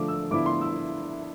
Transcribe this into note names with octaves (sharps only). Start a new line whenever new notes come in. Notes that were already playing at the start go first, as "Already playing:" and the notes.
Already playing: D3 F3 A3 D6
E6
D3 F3 B3 E4 D6
C6
E6